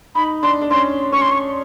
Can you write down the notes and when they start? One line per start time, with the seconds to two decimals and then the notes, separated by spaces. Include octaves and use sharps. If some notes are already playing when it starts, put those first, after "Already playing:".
0.15 D#4 B5
0.43 D4 C6
0.61 D4
0.71 C#4 C6
1.12 C#4 C#6
1.22 C6
1.31 C#6